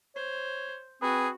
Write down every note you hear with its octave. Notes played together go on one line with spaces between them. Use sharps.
C5 C#5
C4 F#4 G#4 B4